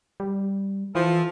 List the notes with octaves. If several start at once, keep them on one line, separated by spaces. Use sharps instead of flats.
G3
E3 F3 A4